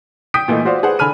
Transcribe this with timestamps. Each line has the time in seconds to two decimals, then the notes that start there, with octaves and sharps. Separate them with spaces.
0.34 G5 D#6 G6 B6 D7
0.48 A#2 E3 A3 D#4
0.65 F4 F#4 C5 D5 F5
0.83 G#4 B4 C5 F#5
0.99 D3 G#5 B5 F6 D#7